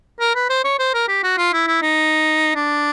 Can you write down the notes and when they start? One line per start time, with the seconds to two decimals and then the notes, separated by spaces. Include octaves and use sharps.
0.20 A#4
0.35 B4
0.50 C5
0.64 C#5
0.79 C5
0.94 A#4
1.08 G4
1.24 F#4
1.38 F4
1.54 E4
1.68 E4
1.82 D#4
2.55 D4